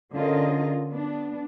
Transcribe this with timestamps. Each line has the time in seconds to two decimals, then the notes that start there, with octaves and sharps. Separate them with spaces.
0.13 D3 C#4 F4 G#4 A#4 D#5
0.92 B3 D4